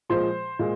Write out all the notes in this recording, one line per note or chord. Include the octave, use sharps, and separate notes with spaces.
A#2 F3 G#3 C5 C6
A#2 G#3